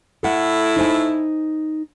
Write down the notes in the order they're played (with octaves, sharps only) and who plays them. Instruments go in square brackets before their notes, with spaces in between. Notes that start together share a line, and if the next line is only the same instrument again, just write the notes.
[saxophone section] A2 E4 [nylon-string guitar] A4 F#5
[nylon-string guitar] D#4 C5 G#5